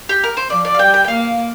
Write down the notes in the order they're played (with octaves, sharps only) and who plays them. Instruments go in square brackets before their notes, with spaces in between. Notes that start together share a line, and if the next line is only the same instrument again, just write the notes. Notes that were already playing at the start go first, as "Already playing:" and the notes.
[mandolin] G4
A#4
C5
[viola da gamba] F3 [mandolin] D5
[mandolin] D5
F5
[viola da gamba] G3 [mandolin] G5
[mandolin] G5
G5
[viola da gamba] A#3 [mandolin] F5